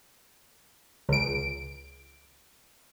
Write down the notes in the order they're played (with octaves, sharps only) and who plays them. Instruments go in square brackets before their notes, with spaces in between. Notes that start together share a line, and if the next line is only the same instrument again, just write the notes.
[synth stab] C#2 D7